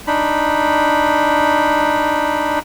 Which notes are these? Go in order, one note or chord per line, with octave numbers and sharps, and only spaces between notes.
D4 D#4 B5